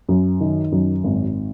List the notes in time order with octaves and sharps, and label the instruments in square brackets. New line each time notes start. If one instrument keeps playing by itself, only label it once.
[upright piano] F#2
D#3
F#2
G#1